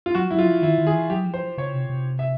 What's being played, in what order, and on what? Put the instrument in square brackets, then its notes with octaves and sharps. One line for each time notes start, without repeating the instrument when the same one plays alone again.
[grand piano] F4
[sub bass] F#3 [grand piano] F#4
[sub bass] F#3 [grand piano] E4
[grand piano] F4
[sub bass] F3
[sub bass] D#3 [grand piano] E4
[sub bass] D#3
[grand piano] G#4
[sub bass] E3
[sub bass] F#3 [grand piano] G4
[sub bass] F3
[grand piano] C5
[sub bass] C#3 [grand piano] C#5
[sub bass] C3
C3
[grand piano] E5